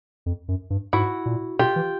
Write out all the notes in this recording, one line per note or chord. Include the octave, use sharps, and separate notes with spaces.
F2
F#2
G2
G#2 E4 F#4
A#2
B2 F4 G4
E3